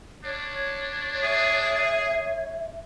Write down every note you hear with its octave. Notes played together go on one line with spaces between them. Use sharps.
D4 C#5
G#4 E5